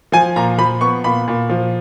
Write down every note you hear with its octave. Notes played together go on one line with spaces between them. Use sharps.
F3 G#5
A#2 A#5
F3 B5
B3 C#6
A#2 B5
A#2
F3